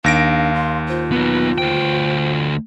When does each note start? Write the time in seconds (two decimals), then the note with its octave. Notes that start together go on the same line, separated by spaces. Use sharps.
0.04 D#2 D4 F5 A#6 D7
0.54 C6
0.88 F4 C5
1.12 B3 D#4 B4
1.58 D2 C5 G5